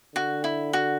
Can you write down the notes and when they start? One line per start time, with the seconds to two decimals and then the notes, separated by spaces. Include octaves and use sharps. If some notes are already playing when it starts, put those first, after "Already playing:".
0.15 D3 F#4
0.44 E4
0.73 F#4